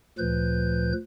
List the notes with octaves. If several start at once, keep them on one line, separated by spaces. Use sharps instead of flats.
D2 A#2 F3 B4 G6